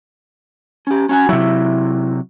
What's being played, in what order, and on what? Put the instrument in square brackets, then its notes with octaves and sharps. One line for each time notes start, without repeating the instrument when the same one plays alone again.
[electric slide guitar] C#4 G4
C#4 F#4 G#5
[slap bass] C3 F#3 [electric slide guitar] E4 E5